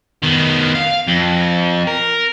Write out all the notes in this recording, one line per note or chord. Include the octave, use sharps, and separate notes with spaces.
D#3 B3
F5
F2
A#4